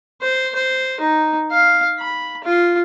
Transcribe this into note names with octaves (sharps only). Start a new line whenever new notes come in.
C5
C5
D#4
F5
B5
F4